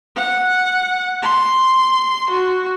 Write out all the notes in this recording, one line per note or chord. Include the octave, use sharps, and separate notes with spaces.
F#5
C6
F#4